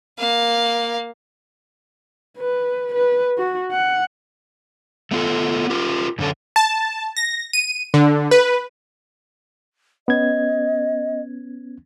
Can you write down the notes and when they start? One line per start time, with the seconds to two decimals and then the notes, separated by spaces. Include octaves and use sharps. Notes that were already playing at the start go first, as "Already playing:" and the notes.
0.19 A#3 F5
2.38 B4
2.95 B4
3.38 F#4
3.72 F#5
5.11 A3 B3 F4 F#4 A4
5.70 F4 G4 A#4
6.19 F#2 D3 C#4 A4
6.56 A5
7.17 A#6
7.53 D#7
7.94 D3
8.31 B4
10.08 B3 C#4 D#5 G#6